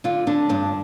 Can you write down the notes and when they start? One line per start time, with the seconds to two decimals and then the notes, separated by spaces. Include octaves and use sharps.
0.04 D3 F4
0.27 D3 D4
0.49 G2 D4